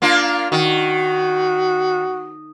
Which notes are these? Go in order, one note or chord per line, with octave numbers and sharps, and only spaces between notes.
A#3 D4 F4
D#3 F#4